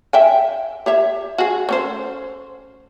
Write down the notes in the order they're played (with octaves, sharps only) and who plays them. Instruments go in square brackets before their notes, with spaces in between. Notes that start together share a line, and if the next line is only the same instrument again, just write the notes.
[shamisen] E5 G5 G#5
G4 C#5 E5
F#4 G#4
A3 C#4 C5